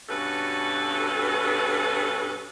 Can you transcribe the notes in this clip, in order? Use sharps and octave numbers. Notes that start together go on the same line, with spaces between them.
G2 B2 C#4 F#4 A4 B4